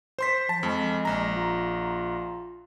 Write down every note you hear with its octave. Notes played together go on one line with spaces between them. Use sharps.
C5 C6 B6
F3 A5
F2 G#3
A#1 A#5
F4